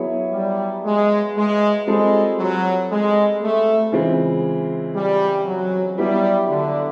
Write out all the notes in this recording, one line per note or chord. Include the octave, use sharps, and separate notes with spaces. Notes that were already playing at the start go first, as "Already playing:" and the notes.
Already playing: F#3 B3 E4 G#4 C#5
G3
G#3
G#3
G3 G#3 C4 F4 A4
F#3
G#3
A3
C#3 E3 G#3 C4 F4
G3
F#3
F#3 G3 B3 E4 G4 B4
D3